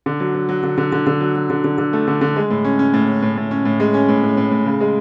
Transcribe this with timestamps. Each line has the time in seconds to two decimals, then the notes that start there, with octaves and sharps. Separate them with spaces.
0.06 D3
0.20 F#3
0.35 F#3
0.49 F#3
0.63 D3
0.78 D3
0.92 D3
1.07 D3
1.21 F#3
1.36 F#3
1.50 D3
1.64 D3
1.78 D3
1.93 A3
2.08 D3
2.21 D3
2.36 G#3
2.50 A2
2.64 C#4
2.79 C#4
2.94 A2
3.08 C#4
3.22 A2
3.37 A2
3.51 C#4
3.65 A2
3.80 G#3
3.94 C#4
4.09 A2
4.23 A2
4.37 A2
4.51 A2
4.66 C#3
4.80 G#3